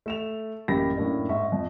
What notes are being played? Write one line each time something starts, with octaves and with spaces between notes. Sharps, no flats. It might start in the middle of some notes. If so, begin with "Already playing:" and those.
A3 E7 F7
A1 F#2 A#3 G4 B5 A#6
F#2 A2 A#3 D4
G#2 E5 C#6
F2